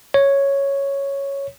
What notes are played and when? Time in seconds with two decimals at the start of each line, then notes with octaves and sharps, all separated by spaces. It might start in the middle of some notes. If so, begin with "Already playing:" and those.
0.14 C#5